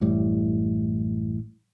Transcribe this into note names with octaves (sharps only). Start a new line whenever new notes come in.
A1 F#2 A2 G3